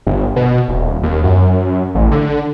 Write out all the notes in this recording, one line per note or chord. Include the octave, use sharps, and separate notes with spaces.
G1
B2
D#1
D#2
F#2
A1
D3